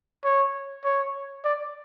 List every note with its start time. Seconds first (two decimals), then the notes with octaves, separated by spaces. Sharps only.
0.24 C#5
0.84 C#5
1.44 D5